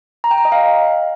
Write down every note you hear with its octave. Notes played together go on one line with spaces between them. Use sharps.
A#5
G5
A#5
D#5
F5